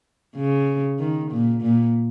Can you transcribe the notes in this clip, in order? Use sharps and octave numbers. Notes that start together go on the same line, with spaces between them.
C#3
D#3
A#2
A#2